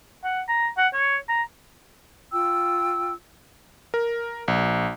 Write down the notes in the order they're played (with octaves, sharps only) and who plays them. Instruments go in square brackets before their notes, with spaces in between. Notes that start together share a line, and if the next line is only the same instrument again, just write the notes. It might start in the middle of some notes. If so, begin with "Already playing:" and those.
[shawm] F#5
A#5
F#5
C#5
A#5
[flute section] F4 G5 E6
[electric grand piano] A#4
A#1